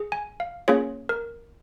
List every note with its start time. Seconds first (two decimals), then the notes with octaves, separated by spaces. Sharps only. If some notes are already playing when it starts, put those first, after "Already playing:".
Already playing: G#4
0.12 G#5
0.40 F5
0.68 A#3 C#4 F4 G#4 C#5
1.09 A#4